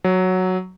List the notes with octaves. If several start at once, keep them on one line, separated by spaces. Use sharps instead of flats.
F#3